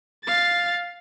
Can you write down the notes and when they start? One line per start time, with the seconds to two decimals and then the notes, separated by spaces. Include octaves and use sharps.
0.25 F5 A6